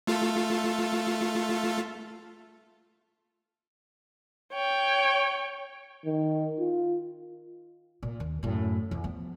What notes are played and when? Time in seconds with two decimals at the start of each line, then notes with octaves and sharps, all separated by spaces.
0.07 A3 F4 A4
4.52 C#5 G5
6.06 D#3
6.59 F4
8.03 A#2
8.20 D#2
8.43 F#2 A2
8.91 E2
9.04 F3 B3